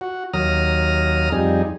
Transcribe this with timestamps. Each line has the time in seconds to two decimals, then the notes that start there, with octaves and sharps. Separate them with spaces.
0.01 F#4
0.33 D#2 F#3 A#5 D#6 F6
1.32 F2 G3 D#4 G#4